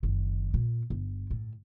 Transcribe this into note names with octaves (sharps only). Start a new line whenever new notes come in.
F#1 D#3
A#2
G1
A2